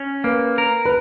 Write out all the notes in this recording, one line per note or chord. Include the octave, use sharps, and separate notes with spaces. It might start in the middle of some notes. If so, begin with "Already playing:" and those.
Already playing: C#4
A#3 B4
A#4
B4